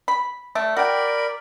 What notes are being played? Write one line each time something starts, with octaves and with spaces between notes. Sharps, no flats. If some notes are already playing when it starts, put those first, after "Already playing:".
B5
A3 D5 E5
F#4 A#4 D5 G5 B5